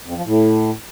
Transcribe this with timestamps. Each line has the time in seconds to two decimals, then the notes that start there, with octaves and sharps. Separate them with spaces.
0.06 F2
0.16 F3
0.26 A2